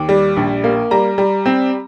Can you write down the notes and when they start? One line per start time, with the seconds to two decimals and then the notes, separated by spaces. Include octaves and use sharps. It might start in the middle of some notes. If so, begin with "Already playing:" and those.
Already playing: D#2 D6
0.09 G3
0.37 A#1
0.64 A#3
0.91 G3 A#5
1.18 G3
1.46 C4